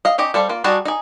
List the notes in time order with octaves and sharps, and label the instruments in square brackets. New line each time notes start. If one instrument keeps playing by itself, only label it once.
[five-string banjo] D#5 F5
C#4 D#4 G4 D#5
G3 A4 C5 F5
A#3 F4
G3 D#4 F#4 G#4 A5
D#4 G#4